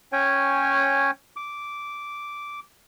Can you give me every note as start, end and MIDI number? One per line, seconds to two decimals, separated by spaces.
0.13 1.11 61
0.13 1.11 73
0.13 1.11 79
0.13 1.11 80
1.36 2.60 86